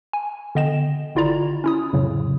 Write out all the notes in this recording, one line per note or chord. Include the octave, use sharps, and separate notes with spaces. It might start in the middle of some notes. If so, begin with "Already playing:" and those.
G#5
D3 B3 D#5 G5 E7
G#1 D3 E4 F4 D5 A#5
C#4 E4 D#6
F2 A2 C#3 F#3